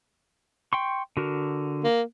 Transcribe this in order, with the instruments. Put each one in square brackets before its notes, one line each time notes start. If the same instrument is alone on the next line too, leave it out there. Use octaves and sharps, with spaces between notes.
[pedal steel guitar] G5 C6 C#6
D3 F#4 A#4
[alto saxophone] A#3